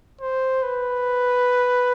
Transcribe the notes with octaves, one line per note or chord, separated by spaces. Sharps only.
C5
B4